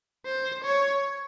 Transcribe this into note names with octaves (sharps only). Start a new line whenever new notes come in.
C5
C#5